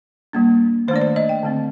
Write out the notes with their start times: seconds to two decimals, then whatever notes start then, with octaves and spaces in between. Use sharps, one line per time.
0.33 G3 A#3 D4
0.88 D#3 C5
0.91 A3 D4 D5
1.01 C5
1.16 D#5
1.29 G5
1.43 D3 A3 C4